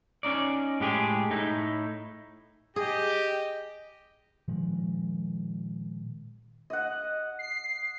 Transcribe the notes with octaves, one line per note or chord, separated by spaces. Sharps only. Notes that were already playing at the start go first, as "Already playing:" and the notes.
C#4 D#4 D5
A2 G#3 G4 G#4
A2 D#4 E4
G4 G#4 D#5
A#2 D#3 F3 G#3
D#5 F#5
C7